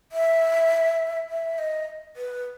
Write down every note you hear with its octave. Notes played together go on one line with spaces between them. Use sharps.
E5
E5
D#5
B4